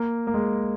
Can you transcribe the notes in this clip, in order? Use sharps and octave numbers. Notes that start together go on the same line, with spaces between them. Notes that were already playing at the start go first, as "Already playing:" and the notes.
Already playing: A#3
A#3
G#3